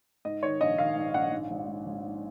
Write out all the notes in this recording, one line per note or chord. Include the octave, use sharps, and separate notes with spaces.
G#2 D#5
D#3 C#5
A#1 D#5
D#3 F5
G#2
A#1 F#5
G#2
G#1
G#2
G#1
G#2